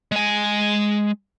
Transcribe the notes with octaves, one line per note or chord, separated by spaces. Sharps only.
G#3 G#5